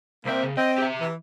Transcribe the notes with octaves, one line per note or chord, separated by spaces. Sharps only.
C2 A#3 C4 E5
C#3
C4 D#5
G4 E5
E3